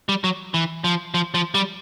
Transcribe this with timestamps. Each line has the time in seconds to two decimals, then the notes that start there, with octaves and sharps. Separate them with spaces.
0.09 G3
0.24 F#3
0.54 E3
0.84 F3
1.14 F3
1.34 F3
1.55 G3